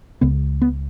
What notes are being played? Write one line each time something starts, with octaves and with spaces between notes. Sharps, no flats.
C#2 C#3 B3
B3